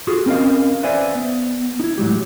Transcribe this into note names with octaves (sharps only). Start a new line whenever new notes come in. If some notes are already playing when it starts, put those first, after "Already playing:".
F4 F#4 G#4 A4
C4 C#4 A#4 C#5 D#5 F5
B4 C5 D5 E5 F5 G#5
B3
D#4 E4
A2 F#3 G#3 G4